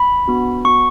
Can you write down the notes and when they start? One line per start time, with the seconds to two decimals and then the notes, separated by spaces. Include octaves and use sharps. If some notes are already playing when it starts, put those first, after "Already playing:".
Already playing: B5
0.28 B3 D4 F#4
0.65 B3 F#4 C#6